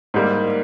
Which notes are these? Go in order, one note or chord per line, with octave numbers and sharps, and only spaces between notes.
G#2 G3 A#3